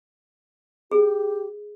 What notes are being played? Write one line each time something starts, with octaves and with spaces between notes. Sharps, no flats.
G4 G#4